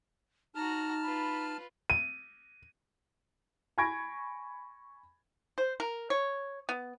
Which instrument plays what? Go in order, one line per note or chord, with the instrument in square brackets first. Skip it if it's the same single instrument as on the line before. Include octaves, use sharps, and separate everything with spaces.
[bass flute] D#4 [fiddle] F#4 A#5 [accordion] A5 F6
[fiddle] F4 B4 [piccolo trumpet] B5
[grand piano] D#7
[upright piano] G#5 B5 C#6 G#6 A#6 D7
[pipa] C5
A#4
C#5
B3